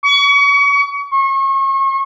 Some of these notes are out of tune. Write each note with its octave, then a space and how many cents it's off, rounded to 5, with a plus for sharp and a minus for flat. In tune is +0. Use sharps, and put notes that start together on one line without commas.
C#6 +35
C#6 -35